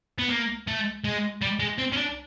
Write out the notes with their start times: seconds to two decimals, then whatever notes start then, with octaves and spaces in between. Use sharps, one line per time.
0.19 B3
0.30 A#3
0.67 A3
1.04 G#3
1.42 G3
1.60 G#3
1.78 C4
1.93 C#4
1.97 D4